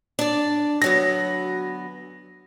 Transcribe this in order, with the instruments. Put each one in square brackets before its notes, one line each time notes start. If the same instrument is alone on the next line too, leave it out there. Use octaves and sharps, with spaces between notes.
[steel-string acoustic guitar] D4 D5
[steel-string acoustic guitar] D2 F#3 B3 [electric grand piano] A#6